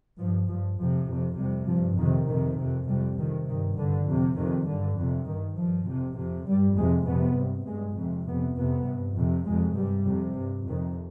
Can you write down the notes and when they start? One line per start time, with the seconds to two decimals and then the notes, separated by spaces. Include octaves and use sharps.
0.19 G2 F3
0.48 G2 F3
0.78 F2 C3 F3
1.08 F2 C3
1.38 F2 C3 G3
1.69 G2 F3
1.98 F2 C3 D#3
2.28 F2 C3 D#3
2.58 F2 C3
2.88 F2 C3 G3
3.18 F2 C3 D#3
3.48 G2 D#3
3.78 G2 D3
4.08 F2 C3
4.38 F2 C3 D#3
4.68 G2 D3
4.98 F2 C3
5.28 G2 D#3
5.58 G2 F3
5.88 F2 C3
6.18 F2 C3
6.48 G2 G3
6.78 F2 C3 G#3
7.08 F2 C3 B3
7.38 G2
7.67 G2 G#3
7.98 F2 C3
8.27 F2 C3 B3
8.58 F2 C3 B3
8.87 G2
9.18 F2 C3
9.48 F2 C3 G#3
9.77 G2 G3
10.07 F2 C3
10.37 G2
10.68 F2 C3 D#3